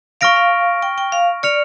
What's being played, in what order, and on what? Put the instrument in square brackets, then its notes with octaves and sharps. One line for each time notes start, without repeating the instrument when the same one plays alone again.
[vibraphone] F5 [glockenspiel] C#6 F6 A#6 D7
[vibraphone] F5
G5
G5
F5
[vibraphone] D5 [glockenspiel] F6 C#7 F7